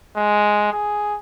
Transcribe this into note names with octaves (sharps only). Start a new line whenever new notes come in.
G#3
G#4